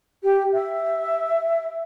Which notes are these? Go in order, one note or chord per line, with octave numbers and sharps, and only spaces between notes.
G4
E5